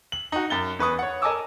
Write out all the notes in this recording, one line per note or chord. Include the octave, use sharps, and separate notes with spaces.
F#7
D#4 F#4
F#2 A6 G7
E2 B4 C#6 D#6
C#5 F#5
A#4 D#5 G#5 A5 D6 E6